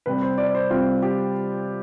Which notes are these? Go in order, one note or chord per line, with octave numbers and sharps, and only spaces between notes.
C3 G3 C4 B4
C5
D5
C5
C3 G3 C4 F4
G4